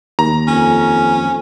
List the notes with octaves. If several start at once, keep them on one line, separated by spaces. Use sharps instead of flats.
D#2 A#5
F2 C#4